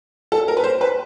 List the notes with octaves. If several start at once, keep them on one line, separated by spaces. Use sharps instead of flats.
A4
A#4
B4
C5
B4